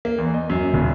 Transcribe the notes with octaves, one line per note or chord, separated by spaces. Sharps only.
A#3
E2
D#5
F#2
D#1